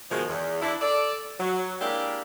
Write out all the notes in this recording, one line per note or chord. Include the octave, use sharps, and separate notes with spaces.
B2 D#3 F3 G#3
E2
D4 E4
A4 D5
F#3
G#3 A#3 D4 E4 G4